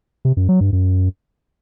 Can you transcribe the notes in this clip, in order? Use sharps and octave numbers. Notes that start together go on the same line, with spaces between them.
C3
F#2
F#3
G2
F#2